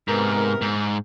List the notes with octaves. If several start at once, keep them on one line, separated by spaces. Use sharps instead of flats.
G#2 C3 B3 A#4
G#2